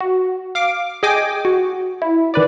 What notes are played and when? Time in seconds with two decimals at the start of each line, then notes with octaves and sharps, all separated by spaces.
0.01 F#4
0.55 F5 D6
1.03 G#4 D#5 G5 G#5 D6
1.45 F#4
2.02 E4
2.34 D#3 B4 D5